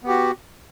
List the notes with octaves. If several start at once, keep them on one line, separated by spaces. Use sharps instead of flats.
B3 F#4 G4